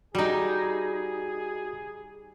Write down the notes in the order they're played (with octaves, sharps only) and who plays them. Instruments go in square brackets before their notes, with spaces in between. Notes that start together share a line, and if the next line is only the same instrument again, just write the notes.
[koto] G3 D#4 [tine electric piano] F#4 [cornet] G#4